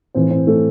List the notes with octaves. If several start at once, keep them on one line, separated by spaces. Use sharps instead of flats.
A2 E3 C4 C5
C4 C5
A3 A4